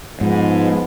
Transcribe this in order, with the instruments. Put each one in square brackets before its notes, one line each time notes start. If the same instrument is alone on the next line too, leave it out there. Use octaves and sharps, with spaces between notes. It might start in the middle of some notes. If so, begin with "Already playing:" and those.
[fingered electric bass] G#2 [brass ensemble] F3 G#3 B3